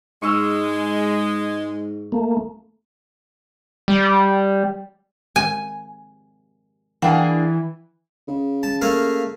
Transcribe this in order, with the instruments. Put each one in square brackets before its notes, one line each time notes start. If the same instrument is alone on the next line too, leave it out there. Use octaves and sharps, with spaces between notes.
[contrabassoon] G#2 [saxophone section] G#3 [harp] C#6 E6 F6
[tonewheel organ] A3 A#3
[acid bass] G3
[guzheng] G#5
[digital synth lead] E3 [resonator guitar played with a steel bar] A#3 D4 G#4 [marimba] F#5 G5
[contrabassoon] C#3
[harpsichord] A5
A3 A#3 F5